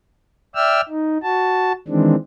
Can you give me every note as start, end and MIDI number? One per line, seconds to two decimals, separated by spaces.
0.55 0.81 74
0.55 0.81 76
0.55 0.81 79
0.55 0.81 88
0.55 0.81 89
0.89 1.18 63
1.23 1.73 66
1.23 1.73 81
1.88 2.16 51
1.88 2.16 52
1.88 2.16 56
1.88 2.16 60
1.88 2.16 62